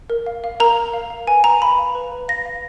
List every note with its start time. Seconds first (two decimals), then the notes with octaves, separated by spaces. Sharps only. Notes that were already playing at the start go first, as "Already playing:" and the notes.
0.10 A#4
0.26 F5
0.44 F5
0.60 A#4 A#5
0.78 A#4
0.94 F5
1.10 F5
1.27 B4 G#5
1.44 B4 A#5
1.61 F5 B5
1.78 F5
1.95 B4
2.12 B4
2.28 F5 A#6
2.46 F5